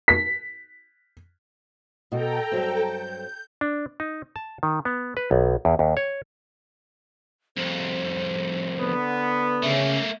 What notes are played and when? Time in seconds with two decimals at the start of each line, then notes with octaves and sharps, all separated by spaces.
0.08 B6
2.12 B2 F#4 A4 G5 A#5
2.52 G2 F#3 C4
2.86 G6
3.61 D4
4.00 D#4
4.36 A5
4.63 D#3
4.85 B3
5.17 B4
5.31 B1
5.65 E2
5.79 D#2
5.97 C#5
7.57 C2 F2 C5
8.79 D3 B3
9.62 C#3 A3 A#3 C#4 E5